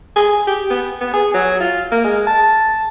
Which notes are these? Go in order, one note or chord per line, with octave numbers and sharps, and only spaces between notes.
G#4
G4
B3
B3
G#4
F#3
F4
A#3
G#3
A5